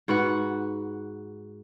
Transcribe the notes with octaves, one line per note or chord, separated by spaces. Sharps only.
G#2 F#4 B4 F#5